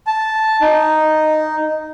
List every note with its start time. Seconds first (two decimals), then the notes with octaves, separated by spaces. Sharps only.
0.07 A5
0.61 D#4